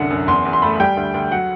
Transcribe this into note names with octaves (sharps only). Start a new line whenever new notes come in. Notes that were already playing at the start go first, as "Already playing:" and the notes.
Already playing: C2 F#2 D3 F#5
F#2
E2 C6
E2
C6
A3 B5
G3 G5
D2
D2
F#3 F#5